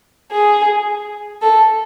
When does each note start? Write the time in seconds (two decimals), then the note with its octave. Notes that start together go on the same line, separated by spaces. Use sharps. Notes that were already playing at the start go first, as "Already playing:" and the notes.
0.32 G#4
1.42 A4